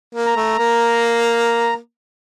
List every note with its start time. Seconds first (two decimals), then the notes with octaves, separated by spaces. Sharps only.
0.15 A#3
0.26 A#5
0.36 A3
0.59 A#3